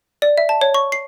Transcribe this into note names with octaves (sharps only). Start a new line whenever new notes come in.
D5
E5
A5
C#5
C#6
C7